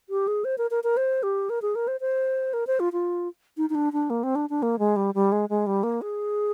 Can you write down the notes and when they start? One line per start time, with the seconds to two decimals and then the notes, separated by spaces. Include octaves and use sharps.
0.10 G4
0.28 G#4
0.45 C5
0.58 A#4
0.71 A#4
0.84 A#4
0.97 C5
1.23 G4
1.50 A#4
1.62 G#4
1.75 A#4
1.88 C5
2.01 C5
2.53 A#4
2.67 C5
2.80 F4
2.93 F4
3.57 D#4
3.70 D#4
3.75 D4
3.93 D4
4.10 A#3
4.23 C4
4.35 D4
4.50 D4
4.63 A#3
4.79 G#3
4.96 G3
5.15 G3
5.32 G#3
5.49 G#3
5.67 G3
5.83 A#3
6.02 G#4